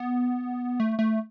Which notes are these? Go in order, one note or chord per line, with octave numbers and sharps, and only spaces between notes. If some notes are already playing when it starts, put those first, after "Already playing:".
Already playing: B3
A3
A3